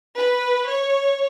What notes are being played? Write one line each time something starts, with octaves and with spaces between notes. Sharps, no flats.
B4
C#5